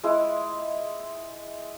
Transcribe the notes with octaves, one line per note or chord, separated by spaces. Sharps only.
G#3 E4